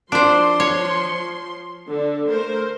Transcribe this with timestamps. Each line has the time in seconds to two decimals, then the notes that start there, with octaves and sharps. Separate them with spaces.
0.12 F3 D4 C5 C6
0.60 C#5
1.88 D3
2.28 A3 A#4 C5